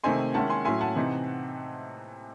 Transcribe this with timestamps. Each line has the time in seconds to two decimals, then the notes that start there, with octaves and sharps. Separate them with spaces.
0.04 C3 D#3 A3 C4 D#4 G#5 C6
0.34 D#3 G#3 C#4 E4 F#5 A5
0.50 G#5 C6
0.65 A2 F#3 C#4 E4 G#5 C6
0.81 F#5 A5
0.96 C3 E3 C4 D#4